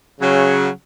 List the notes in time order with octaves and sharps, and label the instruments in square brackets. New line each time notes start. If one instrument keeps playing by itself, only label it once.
[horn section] C#3 F#3